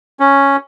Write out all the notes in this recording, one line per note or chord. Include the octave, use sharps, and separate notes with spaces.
C#4